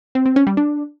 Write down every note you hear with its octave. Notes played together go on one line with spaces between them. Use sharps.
C4
C4
C#4
G3
D4